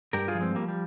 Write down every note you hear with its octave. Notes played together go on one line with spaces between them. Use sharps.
G2 G4 A#4
F4 G#4
F3
G#3 C4
F3 G3 A#3
G3